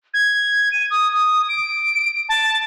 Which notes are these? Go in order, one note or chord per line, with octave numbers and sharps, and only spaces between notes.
G#6
D#7
D#6
D#6
D7
A5